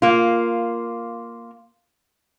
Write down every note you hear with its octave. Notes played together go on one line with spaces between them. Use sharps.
A#3 F4